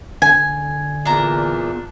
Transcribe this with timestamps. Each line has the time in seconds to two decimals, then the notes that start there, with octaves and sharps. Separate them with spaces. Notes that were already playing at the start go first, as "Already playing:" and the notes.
0.22 D3 G#5
1.05 E2 A#2 D4 A#5